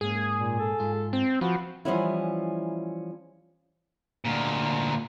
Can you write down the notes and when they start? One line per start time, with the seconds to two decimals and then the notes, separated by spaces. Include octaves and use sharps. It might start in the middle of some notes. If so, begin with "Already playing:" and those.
0.01 G#2 A#3 C#4 G#4
0.38 A#2
0.59 A4
0.80 G#2 F4
1.13 C4
1.41 F3 F#4 B4
1.85 E3 F3 G3 B3 C#4 E4
4.25 D2 A#2